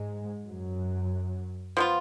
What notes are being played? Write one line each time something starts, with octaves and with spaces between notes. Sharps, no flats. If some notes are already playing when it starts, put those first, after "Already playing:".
Already playing: G#2 G#3
F#2 F#3
F3 B3 F4